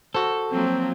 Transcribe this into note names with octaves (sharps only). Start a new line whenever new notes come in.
F#4 A4 C5
F3 F#3 A#3 C4